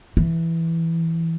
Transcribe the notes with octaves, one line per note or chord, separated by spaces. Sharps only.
E3